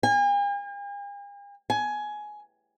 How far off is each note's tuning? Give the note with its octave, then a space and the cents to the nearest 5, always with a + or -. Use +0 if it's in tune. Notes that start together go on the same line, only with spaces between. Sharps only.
G#5 -45
G#5 +15